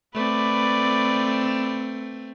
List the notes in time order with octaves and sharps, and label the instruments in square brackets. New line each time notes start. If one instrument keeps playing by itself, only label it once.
[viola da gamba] A3 C4 [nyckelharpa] B4 D5